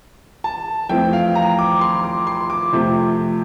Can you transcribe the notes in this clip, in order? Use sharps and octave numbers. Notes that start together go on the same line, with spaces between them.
A5
F2 E3 A3 C4 G5
F5
A#5
D6
C6
D6
C6
D6
F2 C3 F3 A3